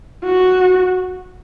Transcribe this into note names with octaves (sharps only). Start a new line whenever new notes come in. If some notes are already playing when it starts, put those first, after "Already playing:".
F#4